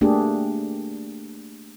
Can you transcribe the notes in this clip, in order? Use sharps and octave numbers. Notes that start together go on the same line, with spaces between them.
A3 A#3 D4 G4 G#4